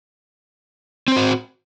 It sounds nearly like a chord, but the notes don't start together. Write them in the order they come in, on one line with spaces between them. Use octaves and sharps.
C4 C5 F#4